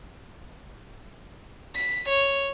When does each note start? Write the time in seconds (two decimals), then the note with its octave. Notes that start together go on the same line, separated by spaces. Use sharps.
1.75 B6
2.08 C#5